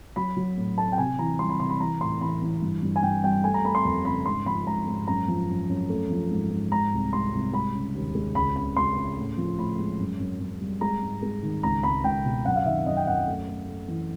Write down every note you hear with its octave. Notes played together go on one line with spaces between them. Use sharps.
F#3 B5
F#3
A2
A3 A5
G5
C3 G#5
E3 A#5
G3 C6
B5
C3 C6
B5
E3 A#5
A2 C6
E3 B5
E3
G2
G2
G#5
G2 G5
G3 G5
A3 G#5
A#5
A3 B5
C6
F2 B5
C#3 B5
G#2 C6
F3 B5
G#2 A#5
G#2
F#2 A#5
F3
F#2
F#2
A3
F3
G#2
G#2
G#3 A#5
C2
G#3 C6
C2
G#3 B5
C#3
D#2
G#3
C#2 B5
C#3 B5
C#2 C6
C#3
A2
F3
A2 B5
G#3
F#2
F#2
F#2
G3
G#3 A#5
G#2
G#3
D#3
C#2 A#5
C#2 B5
C#2 G5
B2
F#2 F#5
F5
D#3 E5
F#2 D#5
G5
F#2 F#5
A3
A3
A3
E3